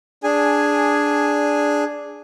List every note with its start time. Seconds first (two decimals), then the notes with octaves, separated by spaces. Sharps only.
0.24 D4 G#4 G#5